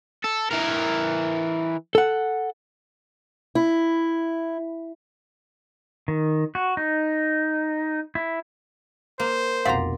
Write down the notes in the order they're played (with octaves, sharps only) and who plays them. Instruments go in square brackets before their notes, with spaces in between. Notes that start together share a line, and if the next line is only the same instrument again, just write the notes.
[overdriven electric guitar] A4
E3 A#4
[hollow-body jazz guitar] A4 F#5
[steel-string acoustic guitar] E4
[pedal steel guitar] D#3
F#4
D#4
E4
[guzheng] A#3 [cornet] C5
[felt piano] F1 B1 F2 [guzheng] D5 A#5 [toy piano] F5 F#5 C6